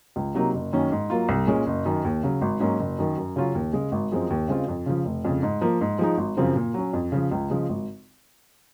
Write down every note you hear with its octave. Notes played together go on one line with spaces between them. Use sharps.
C#2
C3 F#3 A#3 D#4
F#1
F#2 D#3 A#3 C#4
G#2
F#3 A#3 F4
C2
A#2 G#3 C#4
F#1
F#2 D#3
D#2
C#3 F#3
G#1
G#2 F#3 A#3 C#4
F#1
F#2 D#3
F#2
C#3 F#3 C#4 F4
D#2
C#3 G#3
G#1
F#2 F3 G#3 C4
D#2
C#3 G#3 C4 F4
F2
C#3 F3
F1
F2 C#3
G#2
F3 A#3
G#2
F3 G#3 D#4
G#1
F#2 C#3 F3 C4
A#2
F#3 C#4
F2
C#3 F3
C#2
C#3 F3 G#3
G#1